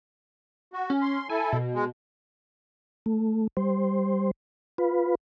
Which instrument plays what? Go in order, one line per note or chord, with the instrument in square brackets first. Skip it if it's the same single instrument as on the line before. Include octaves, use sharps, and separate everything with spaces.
[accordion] F#4
[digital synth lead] C#4
[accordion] C6
[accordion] E4 A4 [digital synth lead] G#5
[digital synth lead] B2
[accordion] G#3
[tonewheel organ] A3
G3 C5
F4 B4